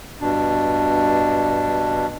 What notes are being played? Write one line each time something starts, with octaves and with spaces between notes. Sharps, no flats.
G2 B2 D4